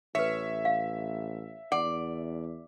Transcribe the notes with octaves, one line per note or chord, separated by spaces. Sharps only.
A1 A4 B4 C#5 E5
F5
E2 D5 F#5